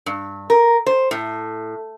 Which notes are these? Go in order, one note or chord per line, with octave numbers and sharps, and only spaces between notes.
G2
A#4
C5
A2